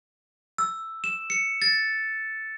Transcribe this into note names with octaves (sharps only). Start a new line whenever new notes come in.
E6
E7
C#7
A6